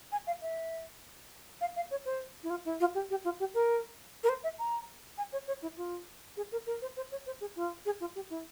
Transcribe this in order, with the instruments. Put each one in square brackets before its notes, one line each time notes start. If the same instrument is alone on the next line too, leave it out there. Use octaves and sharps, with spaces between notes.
[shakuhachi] G#5
F5
E5
F5
F5
C#5
C5
E4
F4
E4
F4
G4
G4
F4
G4
A#4
A#4
C5
E5
A#5
G#5
C#5
C#5
E4
F4
G#4
A#4
A#4
C5
C5
C#5
C5
G#4
F4
G#4
F4
G4
E4